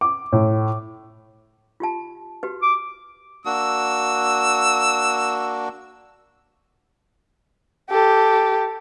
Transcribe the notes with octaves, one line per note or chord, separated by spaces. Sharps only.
D6
A2
F4 G4 A5
F#4 G4 B4
D6
A#3 D4 F#4 E6
G4 A4